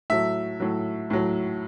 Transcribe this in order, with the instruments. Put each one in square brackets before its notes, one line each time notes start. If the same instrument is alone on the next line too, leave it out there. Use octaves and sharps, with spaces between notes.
[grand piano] A2 F#3 E5
A2 F#3
A2 F#3